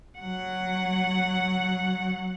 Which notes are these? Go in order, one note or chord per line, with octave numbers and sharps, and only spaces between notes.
F#3 F#5